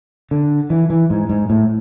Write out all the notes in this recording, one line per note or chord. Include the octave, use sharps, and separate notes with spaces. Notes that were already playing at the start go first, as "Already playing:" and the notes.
D3
E3
E3
G#2
G#2
A2